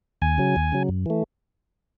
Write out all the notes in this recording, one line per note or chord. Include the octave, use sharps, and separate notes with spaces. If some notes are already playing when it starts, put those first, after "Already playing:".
D#2 G#5
C#3 F#3
D#2
C#3 F#3
F#2
E3 A3